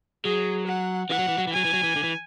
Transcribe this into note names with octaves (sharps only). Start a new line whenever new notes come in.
F#3 G#4
F#5
E3 F#5
F#3
E3
F#3
E3
F#3 G#5
E3
F#3
E3
D3
E3